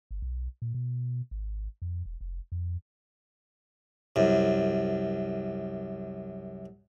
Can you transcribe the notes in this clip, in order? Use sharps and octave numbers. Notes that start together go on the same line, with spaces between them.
G1
B1
A#2
B2
G#1
F2
E1
F1
F2
C2 F#2